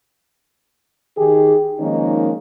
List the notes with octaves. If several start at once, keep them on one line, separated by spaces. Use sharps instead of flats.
D#3 D#4 G4 G#4
D#3 F3 G#3 A#3 C#4 D#4